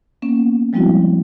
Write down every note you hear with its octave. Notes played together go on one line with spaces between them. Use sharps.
A#3 B3 C#4
F3 G3 G#3 C4 E4 F#4